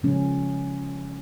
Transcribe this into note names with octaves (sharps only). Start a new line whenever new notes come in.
C#3 F3 G#3 C#4